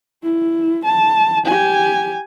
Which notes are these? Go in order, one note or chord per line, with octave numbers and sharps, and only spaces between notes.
E4
A5
G4 G#5